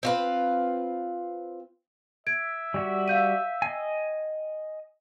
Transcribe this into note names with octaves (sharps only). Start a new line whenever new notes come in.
C4 F4 B4
E5 G#6 D7
G3 F#4 G4
F5 G6 D#7
D#5 G5 G#5